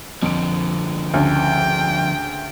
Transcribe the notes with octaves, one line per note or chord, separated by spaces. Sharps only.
F2 D3 F3 D7
D2 C#3 G5